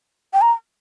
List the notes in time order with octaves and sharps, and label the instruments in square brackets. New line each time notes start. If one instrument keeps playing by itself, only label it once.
[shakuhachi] G5
A#5